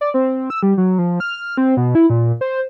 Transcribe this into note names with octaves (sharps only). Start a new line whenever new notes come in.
D5
C4
E6
G3
F#3
F3
F6
C4
B2
E4
A#2
C5